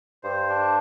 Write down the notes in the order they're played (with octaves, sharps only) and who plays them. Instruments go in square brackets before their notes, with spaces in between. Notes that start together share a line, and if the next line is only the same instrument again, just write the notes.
[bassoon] G2 [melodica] C5
[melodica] D4